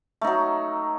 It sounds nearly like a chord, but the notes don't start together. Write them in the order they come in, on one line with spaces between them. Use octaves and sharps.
A3 D#4 F#3